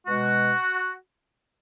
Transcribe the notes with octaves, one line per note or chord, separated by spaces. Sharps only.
B2 G#3 F#4